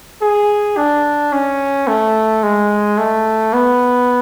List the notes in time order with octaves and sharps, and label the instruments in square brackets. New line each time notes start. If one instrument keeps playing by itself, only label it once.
[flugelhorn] G#4
D4
C#4
A3
G#3
A3
B3